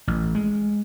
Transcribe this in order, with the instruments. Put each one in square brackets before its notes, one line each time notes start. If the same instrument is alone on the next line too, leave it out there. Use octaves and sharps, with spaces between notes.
[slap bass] A1
G#3